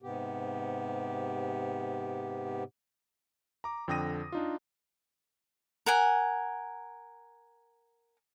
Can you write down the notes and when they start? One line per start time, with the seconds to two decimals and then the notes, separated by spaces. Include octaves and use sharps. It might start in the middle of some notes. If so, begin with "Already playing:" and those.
0.02 G#2 C3 B3 G4
3.64 A#5 D6
3.88 F2 D3 G5 D#6 A#6 D#7
4.32 D4 D#4 F4
5.86 A#4 F#5 G#5